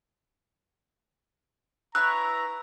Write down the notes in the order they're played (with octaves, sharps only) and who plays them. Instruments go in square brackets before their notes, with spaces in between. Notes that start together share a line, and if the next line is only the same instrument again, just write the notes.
[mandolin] E4 B4 C#5 [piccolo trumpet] A#5 [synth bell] E6 [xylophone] F#6